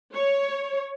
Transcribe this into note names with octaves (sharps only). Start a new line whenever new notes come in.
C#5